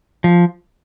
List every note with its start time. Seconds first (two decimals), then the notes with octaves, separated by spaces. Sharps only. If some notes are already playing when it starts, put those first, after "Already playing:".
0.24 F3